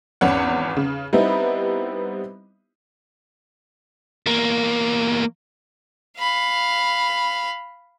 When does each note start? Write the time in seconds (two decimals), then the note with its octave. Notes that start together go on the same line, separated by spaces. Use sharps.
0.21 G#1 E2 C#4 F#5
0.77 C#3
1.13 G3 B3 C4 D#4 E4
4.26 E2 A#3
6.18 F5 B5